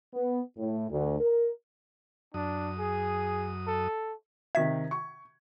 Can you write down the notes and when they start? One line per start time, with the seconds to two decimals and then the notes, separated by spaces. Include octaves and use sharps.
0.13 B3
0.57 A2
0.90 D2
1.19 A#4
2.34 F#2 D4 D#6
2.79 G#4
3.67 A4
4.55 C3 D#3 E5 G#6 B6
4.91 C#6